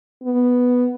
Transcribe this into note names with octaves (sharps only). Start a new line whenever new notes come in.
B3